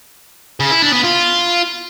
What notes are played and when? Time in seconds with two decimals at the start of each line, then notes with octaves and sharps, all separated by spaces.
0.60 C#3
0.71 E4
0.82 D4
0.93 B3
1.04 F4